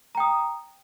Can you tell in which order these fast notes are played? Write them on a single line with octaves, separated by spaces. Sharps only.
A#5 G5 D#6